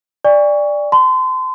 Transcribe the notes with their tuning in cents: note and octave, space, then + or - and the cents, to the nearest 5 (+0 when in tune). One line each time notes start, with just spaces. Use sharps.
D5 +5 G#5 -45 C#6 +15
A5 +0 C6 -30